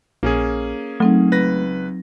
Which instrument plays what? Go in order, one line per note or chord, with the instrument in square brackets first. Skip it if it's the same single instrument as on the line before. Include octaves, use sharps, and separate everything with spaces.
[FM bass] A#1 [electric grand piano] A#3 C#4 G#4
[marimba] F#3 C4 D#4 [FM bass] A3
[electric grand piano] C#2 B4 A#6